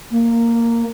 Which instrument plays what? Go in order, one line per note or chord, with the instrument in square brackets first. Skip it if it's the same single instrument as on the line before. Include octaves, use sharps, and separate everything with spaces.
[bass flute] A#3